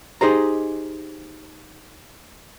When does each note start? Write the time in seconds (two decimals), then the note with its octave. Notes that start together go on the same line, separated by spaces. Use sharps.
0.21 D#4 G4 G#4 C5 D#5 A#5